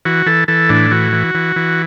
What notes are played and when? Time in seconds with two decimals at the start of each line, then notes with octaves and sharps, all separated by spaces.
0.05 E3 F#4
0.26 E3 A4
0.48 E3 A4
0.69 A2 D4
0.91 E3 F#4
1.12 E3
1.35 E3
1.56 E3